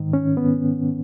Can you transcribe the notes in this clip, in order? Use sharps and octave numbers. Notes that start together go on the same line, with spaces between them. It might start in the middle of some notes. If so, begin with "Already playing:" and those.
Already playing: G#2 D#3
C#4
B3